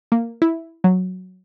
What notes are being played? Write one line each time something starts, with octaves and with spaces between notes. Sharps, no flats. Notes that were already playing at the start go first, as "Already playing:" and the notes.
A#3
E4
F#3